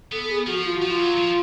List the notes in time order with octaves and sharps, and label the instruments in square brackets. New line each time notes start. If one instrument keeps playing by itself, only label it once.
[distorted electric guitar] B3 [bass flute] A4
[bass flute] G#4
[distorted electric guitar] F3 [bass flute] F#4
[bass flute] F4
F#4
[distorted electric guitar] F3
[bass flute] F4
[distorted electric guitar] G3
F#3
F3